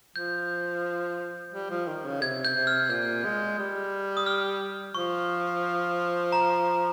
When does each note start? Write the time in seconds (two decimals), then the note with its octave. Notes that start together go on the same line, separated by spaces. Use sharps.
0.16 F3 G6
1.53 G3
1.70 F3
1.87 D#3
2.05 C#3
2.21 C3 G#6
2.45 G6
2.56 C3
2.67 F6
2.90 A#2 G6
3.24 G#3
3.59 G3
4.17 D#6
4.26 F6
4.95 F3 C#6
6.32 A#5